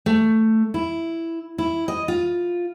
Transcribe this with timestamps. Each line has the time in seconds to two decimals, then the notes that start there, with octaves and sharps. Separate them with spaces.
0.06 A3
0.74 E4
1.58 E4
1.88 D#5
2.08 F4